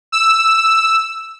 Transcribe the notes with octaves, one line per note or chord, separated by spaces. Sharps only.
E6